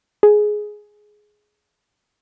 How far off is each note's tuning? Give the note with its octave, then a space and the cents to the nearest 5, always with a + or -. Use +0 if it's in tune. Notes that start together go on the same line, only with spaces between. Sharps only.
G#4 +10